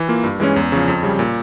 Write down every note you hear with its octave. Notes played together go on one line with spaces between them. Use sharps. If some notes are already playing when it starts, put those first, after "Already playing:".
Already playing: E3
A#3 F4
G2
E3 G#3 C#4
E2
C#3 F3
F2
C#3 G3
A#2